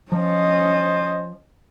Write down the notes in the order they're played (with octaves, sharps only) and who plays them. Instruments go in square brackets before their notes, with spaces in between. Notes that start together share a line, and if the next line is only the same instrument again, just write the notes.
[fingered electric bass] F3 [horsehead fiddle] C#4 D#5 [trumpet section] C5 A5